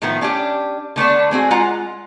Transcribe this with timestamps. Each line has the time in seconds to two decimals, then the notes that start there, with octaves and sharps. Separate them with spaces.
0.02 A2 D#3 F3 A3 B3
0.21 C#4 D4 F#4 G4
0.96 D3 A3 B3 D4
1.31 G#3 C4 F#4 G#4
1.51 G#3 F4 F#5 A#5